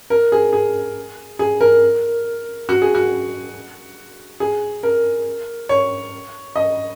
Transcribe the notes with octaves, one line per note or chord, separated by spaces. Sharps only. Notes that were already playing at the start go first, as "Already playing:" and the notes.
A#4
G#4
G#4
G#4
A#4
F#4
G#4
F#4
G#4
A#4
C#5
D#5